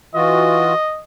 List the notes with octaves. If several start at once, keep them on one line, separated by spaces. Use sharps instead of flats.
E3 F4 F#4 D#5